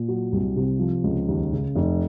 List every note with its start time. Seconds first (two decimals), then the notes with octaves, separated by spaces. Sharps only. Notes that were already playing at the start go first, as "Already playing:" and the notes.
Already playing: A#2
0.08 F#3
0.32 C2
0.56 C3
0.79 F3
1.04 C#2
1.28 D#2
1.53 C#3
1.76 F1